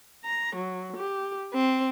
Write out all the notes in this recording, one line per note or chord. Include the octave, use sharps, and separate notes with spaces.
A#5
F#3
G4
C4